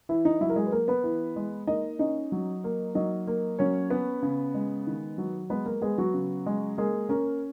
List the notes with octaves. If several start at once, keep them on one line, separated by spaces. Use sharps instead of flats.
E3 E4
D#4
F#3 E4
A#4
G#3 G#4
B4
A#3 A#4
B3 B4
E3
G#3
A#3 D#4 D#5
C#4 D#4 D#5
F#3
A#3
F#3 D#4 D#5
A#3
F#3 C#4 C#5
B3 C#4 B4
C#3
G#3
D#3
F#3
G#3 B3 B4
A#3 A#4
G#3 B3 G#4
F#3 F#4
C#3
G#3
G#3 A#3 G#4
A#3 C#4 A#4